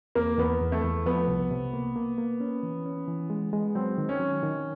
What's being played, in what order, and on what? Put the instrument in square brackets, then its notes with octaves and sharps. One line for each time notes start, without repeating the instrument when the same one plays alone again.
[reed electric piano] E2 [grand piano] A#3
[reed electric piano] E2 [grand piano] B3
[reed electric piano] E2
[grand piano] A3
[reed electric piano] E2
[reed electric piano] F3 [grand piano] B3
[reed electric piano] C2
C3
A#3
A#3
A#3
C#4
E3
C#4
E3
G#3
G#3
[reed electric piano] F#3 [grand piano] C4
[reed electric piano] D#3
[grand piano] C#4
[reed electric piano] F#3
D#3